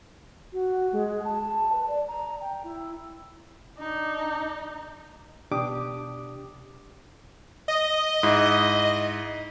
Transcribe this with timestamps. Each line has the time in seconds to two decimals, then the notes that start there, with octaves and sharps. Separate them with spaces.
0.52 F#4
0.92 G#3
1.24 A5
1.72 B4
1.87 D5
2.07 A#5
2.41 G5
2.63 E4
3.79 D4 D#4
5.51 B2 D4 G4 D6 D#6
7.68 D#5
8.23 G#2 E4